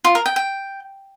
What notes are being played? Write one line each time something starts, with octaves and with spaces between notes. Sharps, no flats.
F4
A#4
G5
G5